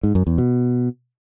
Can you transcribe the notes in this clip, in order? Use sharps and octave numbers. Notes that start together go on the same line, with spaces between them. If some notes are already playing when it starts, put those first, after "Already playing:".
G#2
F#2
E2
B2